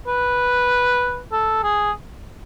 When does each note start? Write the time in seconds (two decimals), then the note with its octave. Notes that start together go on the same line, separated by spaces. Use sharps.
0.07 B4
1.32 A4
1.63 G#4